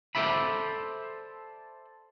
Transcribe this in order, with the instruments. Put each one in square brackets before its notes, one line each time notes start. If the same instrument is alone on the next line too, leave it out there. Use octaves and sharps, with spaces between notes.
[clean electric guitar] A4 A#4 C5 D5 E5 B5